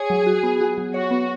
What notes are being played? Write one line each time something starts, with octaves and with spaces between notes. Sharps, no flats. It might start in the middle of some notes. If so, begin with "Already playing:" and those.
Already playing: G#4 C#5
F#3
F#4
B3
F#4
F#3
F#4 C#5
B3